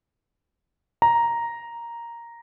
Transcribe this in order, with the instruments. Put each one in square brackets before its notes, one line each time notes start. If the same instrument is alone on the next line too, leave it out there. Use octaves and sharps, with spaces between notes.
[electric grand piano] A#5